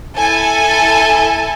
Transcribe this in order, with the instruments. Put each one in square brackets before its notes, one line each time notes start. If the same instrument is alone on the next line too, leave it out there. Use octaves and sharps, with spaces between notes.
[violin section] E4 A4 G#5